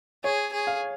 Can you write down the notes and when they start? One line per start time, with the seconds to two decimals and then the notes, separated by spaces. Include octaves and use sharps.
0.24 G#4 C#5
0.53 G#4
0.67 F5